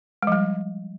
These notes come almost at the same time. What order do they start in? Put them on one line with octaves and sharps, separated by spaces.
G#3 F3 G3